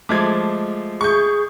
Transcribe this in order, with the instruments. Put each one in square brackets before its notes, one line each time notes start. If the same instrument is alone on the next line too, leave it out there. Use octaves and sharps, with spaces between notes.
[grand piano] F3 G#3 A3 [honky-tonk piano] D6 G#6
[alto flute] G#4 [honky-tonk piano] C#6 G6